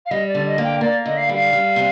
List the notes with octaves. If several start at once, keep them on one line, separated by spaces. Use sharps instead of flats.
F5
G3 D#5
D5
D3
D#5
A#3
G5
A#3 D5
D3 D#5
F5
G3
F5
G3
C3